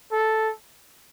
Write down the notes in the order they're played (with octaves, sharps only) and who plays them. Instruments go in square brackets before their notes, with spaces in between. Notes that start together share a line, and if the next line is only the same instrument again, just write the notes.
[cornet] A4